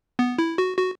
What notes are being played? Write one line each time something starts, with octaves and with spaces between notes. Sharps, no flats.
B3
E4
F#4
F#4